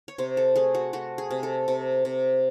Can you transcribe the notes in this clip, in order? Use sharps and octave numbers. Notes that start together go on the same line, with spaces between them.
C#5
C3 C5
A4
A3 G#4
F#4
A3 F#4
G#4
C3
A4
C3
C3